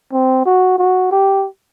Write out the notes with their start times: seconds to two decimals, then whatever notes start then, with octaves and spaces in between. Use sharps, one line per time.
0.12 C4
0.46 F#4
0.79 F#4
1.12 G4